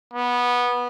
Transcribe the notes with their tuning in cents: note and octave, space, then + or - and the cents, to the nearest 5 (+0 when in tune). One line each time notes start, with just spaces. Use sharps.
B3 -15